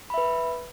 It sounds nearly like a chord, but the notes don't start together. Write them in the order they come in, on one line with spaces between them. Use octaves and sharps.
B5 E5 B4